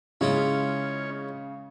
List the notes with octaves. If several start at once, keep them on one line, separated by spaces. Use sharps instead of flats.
C#3 G#3 C#4 E4 F4 C#5